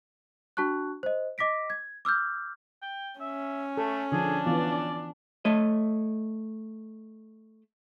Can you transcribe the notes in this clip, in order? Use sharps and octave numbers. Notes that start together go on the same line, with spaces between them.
D4 F#4 A5 C#6 F#6
C5 D#5
D#5 D6 A#6 B6 D7
G#6
D6 E6 F6 G6
G5
C#4 E5
A3 A4
D3 F3 D4 G#4
E3 B3 F4 D5
A3 C#5 D#5